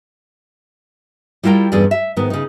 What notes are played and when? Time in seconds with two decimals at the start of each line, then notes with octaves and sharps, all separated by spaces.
1.43 G3 E4 F4 A#4 G5
1.72 E2 G2 C#4 G#4 D5
1.91 E5
2.16 G#2 D#3 B3
2.30 C#3 D#4